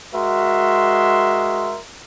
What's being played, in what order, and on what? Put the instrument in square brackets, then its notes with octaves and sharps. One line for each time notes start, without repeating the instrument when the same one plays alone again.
[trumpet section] G#3 F#4 A#4 E5 C6